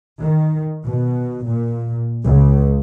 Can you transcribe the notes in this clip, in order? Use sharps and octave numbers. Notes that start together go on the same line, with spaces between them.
D#3
B2
A#2
C#2